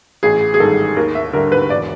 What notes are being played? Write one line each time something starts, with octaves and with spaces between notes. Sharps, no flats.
A1 G#4
G#4
G#2 D#3 G3 A4
D#2 A#4
E5
D3 G3 A#4
B4
E1 D5